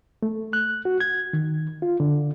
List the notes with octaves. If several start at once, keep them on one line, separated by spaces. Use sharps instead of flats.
A3
F#6
F#4
G#6
D#3
F4
D3